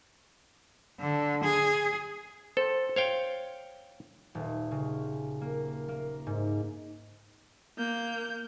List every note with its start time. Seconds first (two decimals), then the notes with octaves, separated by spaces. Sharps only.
1.00 D3
1.43 G#4
2.57 A4 C5
2.96 C5 C#5 F5 G5
4.35 D#1
4.71 C#3
5.41 A#3
5.88 A#3
6.27 G#2
7.78 A#3 G6